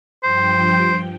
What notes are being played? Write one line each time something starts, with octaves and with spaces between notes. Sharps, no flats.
G2 F3 C5 G5